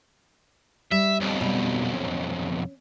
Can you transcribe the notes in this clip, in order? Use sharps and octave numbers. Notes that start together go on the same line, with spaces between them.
G3 E5
B1 F2
B2 G3
C#4